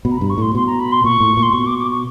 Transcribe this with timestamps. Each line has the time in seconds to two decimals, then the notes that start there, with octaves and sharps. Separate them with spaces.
0.05 B2 B5
0.11 A#5
0.17 G2 B5
0.30 C#6
0.38 A2 C6
0.54 B2 C6
0.66 A#5
0.79 B5
0.92 C6
1.04 A#2 C#6
1.21 A2
1.37 A#2
1.42 C6
1.53 B2 C#6
1.66 D6
1.78 D6
1.91 C#6